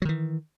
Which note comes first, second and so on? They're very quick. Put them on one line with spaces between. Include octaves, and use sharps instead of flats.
F#3 D#3 E3